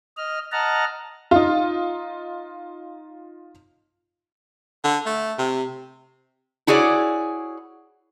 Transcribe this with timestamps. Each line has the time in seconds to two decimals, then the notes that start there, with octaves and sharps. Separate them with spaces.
0.17 D#5 F6
0.52 D#5 F#5 A5 A#5 F6
1.31 D#4 F4
4.84 D3
5.06 A3
5.38 C3
6.67 E4 F#4 G#4 C#5 D5